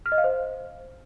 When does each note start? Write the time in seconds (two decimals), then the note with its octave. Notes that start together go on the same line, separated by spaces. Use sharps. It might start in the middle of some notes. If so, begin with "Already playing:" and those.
0.06 F6
0.12 D#5
0.18 F5
0.24 C5